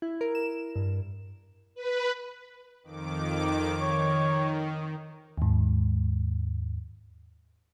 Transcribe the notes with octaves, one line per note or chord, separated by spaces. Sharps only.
E4
A#4
E7
G2
B4
F2 D#3 D6
D#3 C#5
D#2 G#2